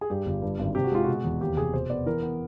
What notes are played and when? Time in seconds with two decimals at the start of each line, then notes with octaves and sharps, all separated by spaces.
0.01 G#4
0.10 G2 G4
0.26 G1
0.42 G2
0.59 G#1
0.75 C3 G4
0.84 F#4
0.92 G#3 F4
1.04 B2 F#4
1.24 E2
1.40 D#2 G4
1.57 F1 G#4
1.74 B2 C5
1.90 B3 D5
2.06 E3 A#4
2.23 B3